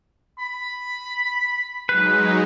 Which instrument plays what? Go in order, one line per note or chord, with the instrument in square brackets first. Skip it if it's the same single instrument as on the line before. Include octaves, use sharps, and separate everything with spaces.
[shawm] B5
[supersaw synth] F#3 G#3 D#4 [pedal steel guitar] B4